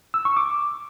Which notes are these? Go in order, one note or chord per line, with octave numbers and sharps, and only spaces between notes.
E6
C#6
D6